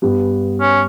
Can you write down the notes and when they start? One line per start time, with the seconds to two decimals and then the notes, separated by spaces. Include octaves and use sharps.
0.02 G2 G3 B3
0.61 C#4